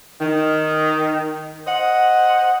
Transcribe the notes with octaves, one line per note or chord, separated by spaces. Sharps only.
D#3
C5 D#5 F#5